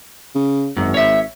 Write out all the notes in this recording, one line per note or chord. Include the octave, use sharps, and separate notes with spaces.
C#3
G#1 F#2
C#5 E5